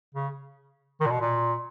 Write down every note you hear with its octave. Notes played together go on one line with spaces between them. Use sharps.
C#3
D#3
A#2
B2
A#2